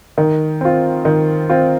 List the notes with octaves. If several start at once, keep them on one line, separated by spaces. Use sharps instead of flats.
D#3
C4 F4
D#3
C4 F4